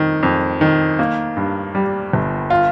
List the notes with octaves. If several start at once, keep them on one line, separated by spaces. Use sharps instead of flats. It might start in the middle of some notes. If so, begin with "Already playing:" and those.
Already playing: F2 D#3
F2
D#3
A#3
G2
G3
G1
F4